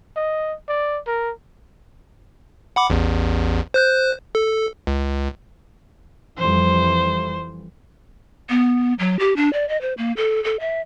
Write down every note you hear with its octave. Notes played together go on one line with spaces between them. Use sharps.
D#5
D5
A#4
F#5 B5 D6
A1 E2
C5 F#6 G6
A4
C#2
F2 E3 G3 C5
B3
F#3
G4
D4
D5
D#5
C5
A#3
A4
A4
E5